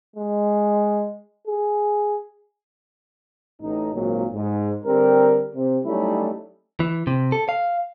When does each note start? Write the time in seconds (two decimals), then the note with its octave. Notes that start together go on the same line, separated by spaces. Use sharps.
0.16 G#3
1.47 G#4
3.62 A1 D#4
3.94 G#1 A#2 F#3
4.34 G#2
4.85 D3 G3 C4 A#4
5.56 C3
5.85 F#3 G3 A3 C#4 D#4 E4
6.80 E3
7.07 C3
7.32 A4
7.49 F5